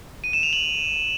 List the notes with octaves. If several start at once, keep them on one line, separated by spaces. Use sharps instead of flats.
D#7
E7
F7
F#7